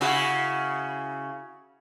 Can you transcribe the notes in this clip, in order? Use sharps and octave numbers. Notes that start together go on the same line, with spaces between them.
C#3 E4 F#4